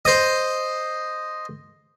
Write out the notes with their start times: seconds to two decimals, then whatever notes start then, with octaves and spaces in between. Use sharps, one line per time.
0.05 C5 D#5